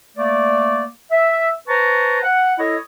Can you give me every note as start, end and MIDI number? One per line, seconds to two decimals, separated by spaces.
0.17 0.85 57
0.17 0.85 58
0.17 0.85 74
1.11 1.50 76
1.68 2.20 71
1.68 2.20 72
1.68 2.20 81
1.68 2.20 82
1.68 2.20 85
2.23 2.57 78
2.58 2.77 64
2.58 2.77 69
2.58 2.77 73
2.58 2.77 75